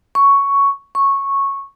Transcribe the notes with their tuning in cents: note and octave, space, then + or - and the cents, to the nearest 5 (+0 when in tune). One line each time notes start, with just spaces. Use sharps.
C#6 +5
C#6 -10